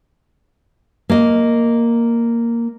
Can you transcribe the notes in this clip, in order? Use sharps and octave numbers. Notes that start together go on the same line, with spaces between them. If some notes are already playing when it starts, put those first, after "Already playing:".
A#3 D#5